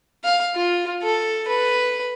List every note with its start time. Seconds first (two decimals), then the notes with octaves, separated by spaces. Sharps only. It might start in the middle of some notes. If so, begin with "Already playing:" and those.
0.24 F5
0.55 F4
1.03 A4
1.48 B4